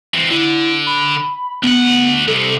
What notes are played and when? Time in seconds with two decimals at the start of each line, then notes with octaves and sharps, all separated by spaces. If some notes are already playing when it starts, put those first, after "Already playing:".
0.14 E3 C4
0.30 D3 E4
0.86 B5
1.63 D2 B3 F#5
2.28 C2 C3 A4